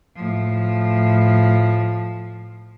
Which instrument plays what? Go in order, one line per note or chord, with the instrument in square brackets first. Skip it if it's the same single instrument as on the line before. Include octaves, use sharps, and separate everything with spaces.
[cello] A2 F3